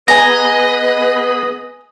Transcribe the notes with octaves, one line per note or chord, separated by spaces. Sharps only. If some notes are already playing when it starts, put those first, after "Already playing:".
B3 G#4 B4 D#5 G#5 A#5 B5